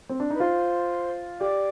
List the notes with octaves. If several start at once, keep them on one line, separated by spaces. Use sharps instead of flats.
C4
D4
D#4 B4
F4 C5
G4 D5